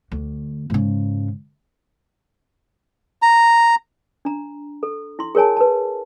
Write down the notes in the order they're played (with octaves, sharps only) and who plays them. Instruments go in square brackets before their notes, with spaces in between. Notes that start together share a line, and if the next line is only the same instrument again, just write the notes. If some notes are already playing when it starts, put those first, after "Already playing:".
[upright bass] D2
G#2 C#3
[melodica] A#5
[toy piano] D4 A#5
A4
E4 C6
G#4 A#4 C#5 G#5 A5
B4 A5